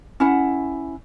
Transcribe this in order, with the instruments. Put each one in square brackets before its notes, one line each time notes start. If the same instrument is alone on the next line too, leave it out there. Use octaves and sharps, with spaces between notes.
[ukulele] C#4 E4 F#5